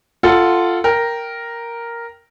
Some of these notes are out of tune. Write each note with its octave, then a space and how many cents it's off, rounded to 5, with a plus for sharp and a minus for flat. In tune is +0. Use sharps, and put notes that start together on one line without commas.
F4 -10 A4 +0 F#5 +5
A#4 +0 G5 +0